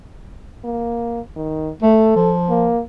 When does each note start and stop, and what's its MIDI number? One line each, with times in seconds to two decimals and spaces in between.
0.64 1.20 58
1.36 1.70 51
1.82 2.15 57
1.82 2.32 69
2.16 2.70 53
2.49 2.81 58